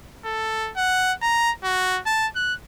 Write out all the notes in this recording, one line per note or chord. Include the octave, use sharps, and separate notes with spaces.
A4
F#5
A#5
F#4
A5
F#6